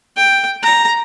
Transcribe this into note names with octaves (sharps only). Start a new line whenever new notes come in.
G5
A#5